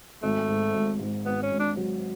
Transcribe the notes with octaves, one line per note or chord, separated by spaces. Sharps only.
G#1 A3
G#2
G#1
G#2
G#1 B3
C#4
G#1
D4
F#3